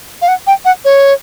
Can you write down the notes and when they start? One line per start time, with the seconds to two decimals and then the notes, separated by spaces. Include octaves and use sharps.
0.22 F5
0.28 F#5
0.47 G5
0.65 F#5
0.85 C#5